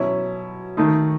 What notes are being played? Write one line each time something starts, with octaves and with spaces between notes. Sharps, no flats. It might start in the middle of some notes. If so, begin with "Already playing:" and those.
Already playing: B2 F#3 C#4 E4
D#3 A3 D#4